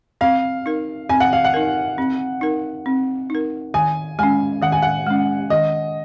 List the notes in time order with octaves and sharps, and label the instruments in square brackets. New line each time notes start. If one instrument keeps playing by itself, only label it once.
[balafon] C4 [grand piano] F5
[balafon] D#4 A#4
[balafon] C4 [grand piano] G#5
[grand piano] F#5
F5
F#5
[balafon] D#4 A#4
C4
D#4 A#4
C4
D#4 A#4
[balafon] D#3 [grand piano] G#5
[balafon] G#3 C#4 [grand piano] G#5
[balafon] D#3 [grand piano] F#5
[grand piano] G#5
F#5
[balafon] G#3 C#4
[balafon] D#3 [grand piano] D#5